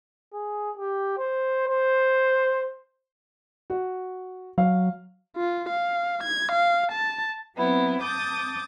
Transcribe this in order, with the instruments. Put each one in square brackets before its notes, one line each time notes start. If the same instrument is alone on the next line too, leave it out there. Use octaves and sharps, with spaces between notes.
[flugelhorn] G#4
G4
C5
C5
[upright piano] F#4
[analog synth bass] F#3 [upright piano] F5
[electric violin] F4
F5
G#6
F5
A5
[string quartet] F#3 B3 C4 E4
A5 D6 D#6 G6 A6